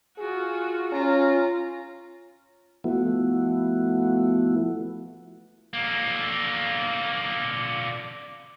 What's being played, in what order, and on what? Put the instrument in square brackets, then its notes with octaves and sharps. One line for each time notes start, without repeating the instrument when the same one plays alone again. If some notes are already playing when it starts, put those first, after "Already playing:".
[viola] F4 F#4 [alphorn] G#4
[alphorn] C#4 [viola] F4 A#5
[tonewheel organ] F3 A3 B3 E4 F#4
[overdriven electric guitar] D3 A#3